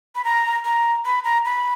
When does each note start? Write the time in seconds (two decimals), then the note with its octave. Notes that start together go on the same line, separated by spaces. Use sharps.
0.15 B5
0.24 A#5
0.65 A#5
1.05 B5
1.24 A#5
1.45 B5